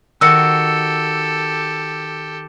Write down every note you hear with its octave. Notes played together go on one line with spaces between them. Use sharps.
D#3 F#4 G4 A4 E6 C#7